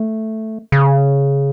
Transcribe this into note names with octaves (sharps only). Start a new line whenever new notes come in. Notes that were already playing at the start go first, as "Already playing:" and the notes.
Already playing: A3
C#3